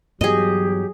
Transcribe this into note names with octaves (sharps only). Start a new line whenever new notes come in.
G2 E3 F#3 B3 G4 G#4 D#5